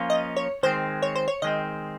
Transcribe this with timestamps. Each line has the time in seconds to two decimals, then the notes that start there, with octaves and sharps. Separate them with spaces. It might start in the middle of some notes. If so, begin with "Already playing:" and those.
Already playing: F3 A#3 C#4 F4
0.10 D#5
0.36 C#5
0.63 D#3 G#3 C4 C5
1.02 C#5
1.15 C5
1.28 C#5
1.42 D#3 G#3 C4 D#5